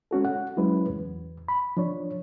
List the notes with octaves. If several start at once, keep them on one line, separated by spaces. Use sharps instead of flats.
G#3 C#4 F#4 A4
F#5
F#3 G#3 C#4 E4 B4
E2
B5
F3 D4 C#5